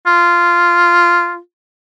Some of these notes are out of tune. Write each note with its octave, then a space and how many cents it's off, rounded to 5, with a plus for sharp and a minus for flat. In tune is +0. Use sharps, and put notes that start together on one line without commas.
F4 -10